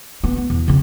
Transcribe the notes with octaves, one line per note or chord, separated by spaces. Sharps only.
B3
B3
E2
C#3 C4